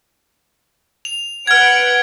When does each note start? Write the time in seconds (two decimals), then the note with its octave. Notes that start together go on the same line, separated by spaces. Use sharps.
1.05 F7
1.47 B4 F#5 F6 G#6 D7